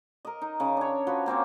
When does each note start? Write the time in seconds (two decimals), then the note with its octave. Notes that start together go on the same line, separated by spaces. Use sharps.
0.25 A#4 D#5
0.41 D#4
0.60 C#3
0.77 D4 C#5
1.07 F3 F#4 B4
1.26 A#3 C4 C#4 C5